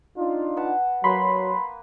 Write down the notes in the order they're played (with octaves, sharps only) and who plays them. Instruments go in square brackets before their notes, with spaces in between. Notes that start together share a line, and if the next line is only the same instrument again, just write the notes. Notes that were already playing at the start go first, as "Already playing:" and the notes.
[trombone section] D4 D#4 F4
[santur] B4 F#5 A5
[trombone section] F#3 [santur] A#3 B4 [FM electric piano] B5 C6